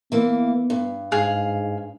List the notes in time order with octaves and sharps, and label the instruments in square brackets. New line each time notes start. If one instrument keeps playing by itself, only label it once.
[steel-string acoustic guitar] E3 A#3 [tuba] B3
[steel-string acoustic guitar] G2
[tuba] G#2 [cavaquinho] G#4 F5